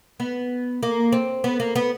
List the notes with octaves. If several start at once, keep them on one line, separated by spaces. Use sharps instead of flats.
B3
A#3
C4
B3
A#3
B3